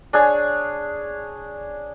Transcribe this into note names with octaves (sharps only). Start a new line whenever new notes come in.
D4 G#4 C#5